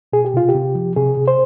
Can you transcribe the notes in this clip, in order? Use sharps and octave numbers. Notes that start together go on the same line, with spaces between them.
B2 G#4
G4
C3 F4
G4
C3
F3
C3 G#4
C3
C5